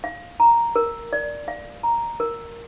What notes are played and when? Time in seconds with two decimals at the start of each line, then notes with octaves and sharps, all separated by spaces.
0.04 F5
0.40 A#5
0.76 A#4
1.13 D5
1.48 F5
1.83 A#5
2.20 A#4